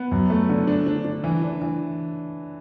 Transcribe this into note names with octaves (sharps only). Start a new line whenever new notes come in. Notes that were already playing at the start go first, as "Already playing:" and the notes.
Already playing: B3
F#2
A3
D3
D4
D4
D4
E3
D4
E3